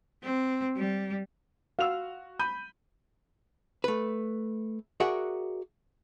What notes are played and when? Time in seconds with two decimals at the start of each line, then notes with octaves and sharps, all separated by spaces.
0.23 C4
0.76 G3
1.79 F#4 F5 E6 F7
2.39 B5 G6 D#7
3.84 A3 B4
5.00 F#4 G#4 A#4 D5 E5 F#5